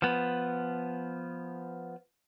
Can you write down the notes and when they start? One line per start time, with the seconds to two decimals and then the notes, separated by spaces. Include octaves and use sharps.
0.02 F3 B3